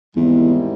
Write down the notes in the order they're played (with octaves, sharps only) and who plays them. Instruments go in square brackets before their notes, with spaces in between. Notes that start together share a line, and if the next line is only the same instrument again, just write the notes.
[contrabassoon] E2 [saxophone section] G#2 D#3 G3 C4 E4